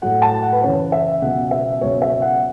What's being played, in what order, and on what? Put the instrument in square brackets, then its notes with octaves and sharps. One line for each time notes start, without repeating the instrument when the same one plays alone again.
[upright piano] A2 F#3 F#5
A5
F#5
B4
F#2 C#3 E3 C#5
E5
C#2 B2 F#3 F#5
E5
C#2 B2 F#3 C#5
E5
F#5